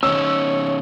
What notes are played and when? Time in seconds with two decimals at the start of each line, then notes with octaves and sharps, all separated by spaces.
0.03 D#3 C#4 C#5 E6